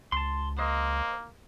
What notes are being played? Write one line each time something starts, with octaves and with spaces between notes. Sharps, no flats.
C#2 A5 C6
A#3 C5 D#5